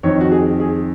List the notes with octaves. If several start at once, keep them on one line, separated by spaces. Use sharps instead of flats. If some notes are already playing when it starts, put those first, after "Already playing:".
F2 D#3 C#5
F#4
G#4
G#4